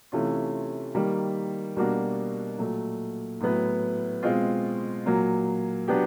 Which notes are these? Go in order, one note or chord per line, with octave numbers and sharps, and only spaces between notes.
C3 E3 A3 C#4 F4
D#3 G3 A#3
B2 G3 A#3 D4 F#4
A#2 F#3 A3
A2 F#3 B3 E4
B2 G#3 C4 F4
A#2 F#3 A#3
F#3 B3 D4 G4